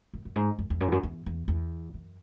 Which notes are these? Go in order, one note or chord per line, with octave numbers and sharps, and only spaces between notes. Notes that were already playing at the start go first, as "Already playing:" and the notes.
F#2
F#2
G#2
F#2
E2
F#2
E2
F#2
E2
E2
E2
F#2